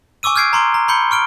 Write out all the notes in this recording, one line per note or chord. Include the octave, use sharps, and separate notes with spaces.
G#5 C#6 D6 E6 D#7
F6 G6 G#6 C7 D7
A#5 C6 D7 G7
A#5
B5 C6 G6 C#7 G7
C#6 F6 D7 G7